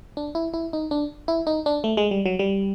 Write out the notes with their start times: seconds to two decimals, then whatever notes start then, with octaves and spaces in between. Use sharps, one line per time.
0.17 D4
0.35 E4
0.54 E4
0.73 D#4
0.91 D4
1.28 E4
1.47 D#4
1.66 D4
1.84 A3
1.97 G#3
2.11 G3
2.26 F#3
2.39 G3